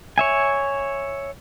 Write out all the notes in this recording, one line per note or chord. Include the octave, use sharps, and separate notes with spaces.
C#5 E5 G#5